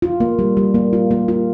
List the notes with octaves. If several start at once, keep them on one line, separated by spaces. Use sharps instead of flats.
F4
A#3
G3
G3
A#3
F4
A#3
F4